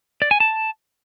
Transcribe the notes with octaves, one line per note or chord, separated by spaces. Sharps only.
D5
G#5
A5